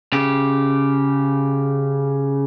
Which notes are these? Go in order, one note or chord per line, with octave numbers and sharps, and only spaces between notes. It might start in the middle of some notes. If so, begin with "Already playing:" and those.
C#3 G4